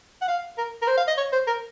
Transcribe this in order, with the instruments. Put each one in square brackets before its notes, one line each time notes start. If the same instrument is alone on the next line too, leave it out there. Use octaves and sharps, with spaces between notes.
[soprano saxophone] F#5
F5
A#4
A#4
C5
F5
D#5
C#5
C5
A#4